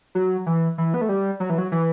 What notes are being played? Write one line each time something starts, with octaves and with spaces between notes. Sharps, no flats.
F#3
E3
E3
B3
A3
G3
F#3
E3
F#3
E3